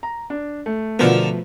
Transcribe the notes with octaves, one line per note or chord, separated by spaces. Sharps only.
A#5
D4
A3
B2 D3 F3 B3 A4 A#4